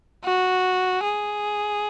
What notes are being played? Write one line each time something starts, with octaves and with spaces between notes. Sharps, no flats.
F#4
G#4